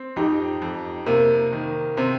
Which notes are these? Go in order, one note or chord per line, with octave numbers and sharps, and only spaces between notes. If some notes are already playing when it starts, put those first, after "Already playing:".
Already playing: C4
F2 D#4 G4
F2
C3 A#3
D#3
C3 C4